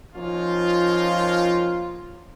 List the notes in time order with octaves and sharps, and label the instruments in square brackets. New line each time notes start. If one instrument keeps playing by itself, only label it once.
[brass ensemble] F3 A#3 C#4 D#4 F4